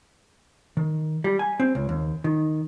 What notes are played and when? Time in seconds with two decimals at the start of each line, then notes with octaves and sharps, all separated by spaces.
0.77 D#3
1.24 G3
1.39 G#5
1.60 C4
1.75 C#2
1.89 D#2
2.24 D#3